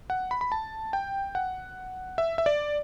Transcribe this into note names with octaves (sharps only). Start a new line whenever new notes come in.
F#5
B5
B5
A5
G5
F#5
E5
E5
D5